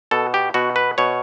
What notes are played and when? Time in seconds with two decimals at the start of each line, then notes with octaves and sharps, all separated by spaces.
0.11 B2 A4
0.34 G4
0.54 B2 F#4
0.76 B4
0.98 B2 C#5